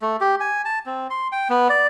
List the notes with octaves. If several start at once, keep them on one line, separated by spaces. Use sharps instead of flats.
A3
G4
G#5
A5
C4
C6
G5
B3
D5